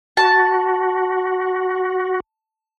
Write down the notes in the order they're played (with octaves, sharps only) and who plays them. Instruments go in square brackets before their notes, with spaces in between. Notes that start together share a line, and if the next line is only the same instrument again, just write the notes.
[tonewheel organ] F#4 [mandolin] A5